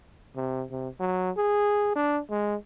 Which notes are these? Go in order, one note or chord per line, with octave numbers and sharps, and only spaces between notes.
C3
C3
F#3
G#4
D4
G#3